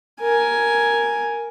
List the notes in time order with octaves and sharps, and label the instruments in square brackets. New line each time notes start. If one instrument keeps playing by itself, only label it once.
[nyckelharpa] A#4 G#5